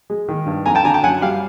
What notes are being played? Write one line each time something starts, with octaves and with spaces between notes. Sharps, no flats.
G#3
D#3
G2
F2 G#5 A#5
G5 A5
D3 G#5 A#5
G5 A5
F#2 F#5 G#5
G3 F5 G5